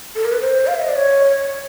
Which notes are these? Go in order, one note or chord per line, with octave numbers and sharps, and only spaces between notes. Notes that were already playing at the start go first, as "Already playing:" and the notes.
A4
A#4
B4
C5
F5
E5
D#5
D5
C#5